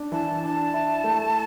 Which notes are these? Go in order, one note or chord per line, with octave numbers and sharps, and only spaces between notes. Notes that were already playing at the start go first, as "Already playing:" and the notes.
Already playing: D4
E3 A5
D4 A5
E4
A3